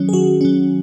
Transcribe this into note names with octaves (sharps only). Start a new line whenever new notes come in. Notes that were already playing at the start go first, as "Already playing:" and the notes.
Already playing: D#3 F#3 C#4
G#4
D#3 F#4
F#3 C#4